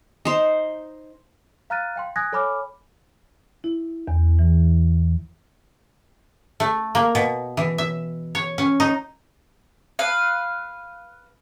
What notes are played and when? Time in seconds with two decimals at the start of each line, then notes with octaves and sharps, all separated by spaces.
0.25 D#4 C5
1.70 F5 A#5 F6 F#6 A6 D#7
1.96 F5 G5 C6
2.16 G#5 D#6 F#6 G#6 A#6
2.33 A4 C#5 G#5 B5 D6 F6
3.64 E4
4.08 E2
4.39 E3
6.60 A3
6.95 A#3
7.15 B2
7.57 E3
7.78 E5
8.35 C#5
8.58 C#4
8.80 D#4
9.99 B4 F5